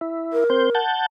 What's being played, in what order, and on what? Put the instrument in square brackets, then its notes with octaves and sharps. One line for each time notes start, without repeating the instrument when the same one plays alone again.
[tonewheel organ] E4
[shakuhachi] A#4
[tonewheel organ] C4 C5 G6
F#5 A5 G6